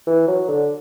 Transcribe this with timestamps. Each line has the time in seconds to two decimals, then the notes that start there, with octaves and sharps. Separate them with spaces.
0.07 E3
0.27 F#3
0.48 D3